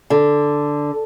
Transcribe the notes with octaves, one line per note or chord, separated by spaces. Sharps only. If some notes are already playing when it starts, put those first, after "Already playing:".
D3